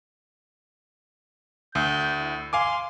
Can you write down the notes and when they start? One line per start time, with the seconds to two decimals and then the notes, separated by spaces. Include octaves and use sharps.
1.75 D2 G6
2.18 E4
2.53 F5 G#5 C6 D6